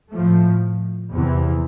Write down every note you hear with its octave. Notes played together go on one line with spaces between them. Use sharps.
A2 F3 A3
E2 C3 E3